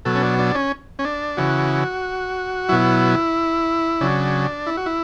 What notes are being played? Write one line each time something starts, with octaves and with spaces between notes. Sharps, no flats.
B2 F#3 A4
C#4
D4
D4
C#4
C#4
D4
C#3 E3 F#4
B2 F#3 E4
C#3 F#3 D4
E4
F#4
E4